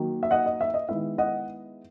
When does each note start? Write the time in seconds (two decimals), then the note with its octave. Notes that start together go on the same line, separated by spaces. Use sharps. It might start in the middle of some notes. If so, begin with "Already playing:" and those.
Already playing: D#3 F#3 A#3
0.23 E5
0.31 D#5 F#5
0.46 D#5
0.61 E5
0.74 D#5
0.89 D#3 G#3 B3 E4 E5
1.18 D#5 F#5